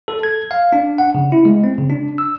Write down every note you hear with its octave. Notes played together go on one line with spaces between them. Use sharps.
A4
G#6
F5
D4
F#5
C#3
E4
G#3
C4
C#3
D4
E6